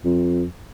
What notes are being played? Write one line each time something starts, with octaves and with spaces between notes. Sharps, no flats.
F2